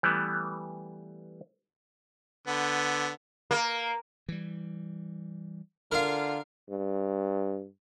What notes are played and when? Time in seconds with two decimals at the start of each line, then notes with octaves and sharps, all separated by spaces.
0.03 E3 G3 A3 B3
2.47 D3 B3
3.51 A#3
4.29 E3 G3
5.92 D3 F4 A#4 F5
6.70 G2